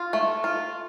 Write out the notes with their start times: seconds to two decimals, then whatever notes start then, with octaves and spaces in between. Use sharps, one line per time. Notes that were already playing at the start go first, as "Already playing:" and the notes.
Already playing: F4
0.13 A3
0.44 F4